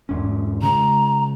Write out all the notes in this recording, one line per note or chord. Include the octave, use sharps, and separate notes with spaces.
E2 G#2 C#4
C#3 G#3 A#5